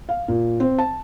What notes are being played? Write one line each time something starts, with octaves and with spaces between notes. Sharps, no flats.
F5
A#2
C4
A5